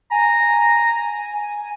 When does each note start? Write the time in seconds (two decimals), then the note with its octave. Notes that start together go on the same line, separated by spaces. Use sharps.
0.11 G#5 A#5